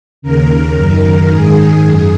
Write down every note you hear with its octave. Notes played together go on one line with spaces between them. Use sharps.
D#2 C#3 A#4
F#2 D#3
G#2 D#3 G#4
F#2 G#4